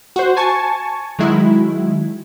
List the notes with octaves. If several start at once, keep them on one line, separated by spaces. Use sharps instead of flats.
F#4 C5
G#5 A5 C#6
D#3 F#3 G#3 E4